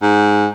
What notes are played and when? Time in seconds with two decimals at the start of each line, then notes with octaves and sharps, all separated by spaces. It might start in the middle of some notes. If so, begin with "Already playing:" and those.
0.02 G#2